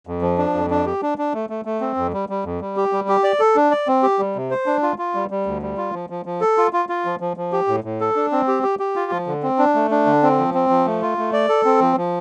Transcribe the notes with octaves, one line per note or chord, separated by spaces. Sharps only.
F2
F3
D4
F2
D4
G4
D4
D4
A3
A3
A3
C4
F2
G3
G3
F2
G3
G4
G3
G4
D5
A4
D4
D5
C4
G4
G3
C3
C5
D4
F4
F4
G3
G3
D2
G3
F4
F3
F3
F3
A4
F4
F4
F4
F3
F3
F3
G4
A2
A2
A4
D4
C4
G4
G4
G4
F4
F3
D3
C4
D4
A3
D4
D3
C4
F3
C4
F3
A3
F4
A3
D5
A4
C4
F3
F3